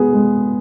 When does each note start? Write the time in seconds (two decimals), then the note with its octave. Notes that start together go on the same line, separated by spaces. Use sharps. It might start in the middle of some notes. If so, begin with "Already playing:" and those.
Already playing: G#3 B3 G#4 B4
0.13 G#3